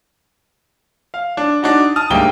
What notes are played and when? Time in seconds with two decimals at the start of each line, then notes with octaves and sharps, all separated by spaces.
1.14 F5
1.37 D4
1.62 D4 D#4 F#4
1.96 A5 D#6 F6
2.10 D2 G#2 G3 A#3 G5 G7